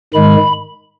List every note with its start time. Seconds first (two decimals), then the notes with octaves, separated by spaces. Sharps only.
0.13 G#2 D#3 G#3 B5